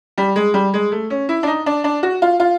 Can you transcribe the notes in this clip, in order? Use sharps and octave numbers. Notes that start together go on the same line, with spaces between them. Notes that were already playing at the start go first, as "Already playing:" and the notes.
G3
G#3
G3
G#3
A3
C#4
E4
D4
D#4
D4
D4
F#4
F4
F4